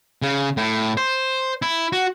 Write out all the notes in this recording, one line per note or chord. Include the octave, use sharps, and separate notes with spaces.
C#3
A2
C5
E4
F#4